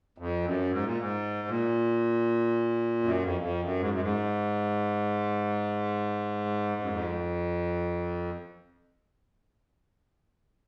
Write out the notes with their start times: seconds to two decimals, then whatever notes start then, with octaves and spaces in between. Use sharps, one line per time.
0.18 F2
0.44 F#2
0.71 G#2
0.84 A#2
0.98 G#2
1.48 A#2
3.03 F#2
3.22 F2
3.41 F2
3.61 F#2
3.79 G#2
3.91 F#2
4.01 G#2
6.82 F#2
6.89 F2